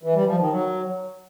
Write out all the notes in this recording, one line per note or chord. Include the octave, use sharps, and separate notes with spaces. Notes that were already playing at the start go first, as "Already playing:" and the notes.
E3
G3
F3
D#3
F#3